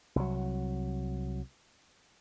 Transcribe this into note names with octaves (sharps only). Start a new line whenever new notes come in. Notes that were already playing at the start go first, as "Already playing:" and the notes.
C2 F#3